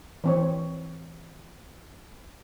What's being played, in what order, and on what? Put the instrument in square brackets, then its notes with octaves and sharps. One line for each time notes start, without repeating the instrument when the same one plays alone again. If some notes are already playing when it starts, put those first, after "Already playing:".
[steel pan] E3 C4 C#5